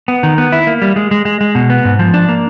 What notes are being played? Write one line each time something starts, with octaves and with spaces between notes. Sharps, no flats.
B3
D#3
B3
E4
A#3
G3
G#3
G#3
G#3
G#3
B2
B3
G#2
F3
D4
A#3